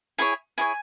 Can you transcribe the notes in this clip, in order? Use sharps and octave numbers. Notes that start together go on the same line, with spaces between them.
E4 G#4 C#5 G#5
E4 G#4 C#5 G#5